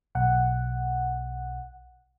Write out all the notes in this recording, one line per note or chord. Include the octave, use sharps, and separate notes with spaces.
B1 F#5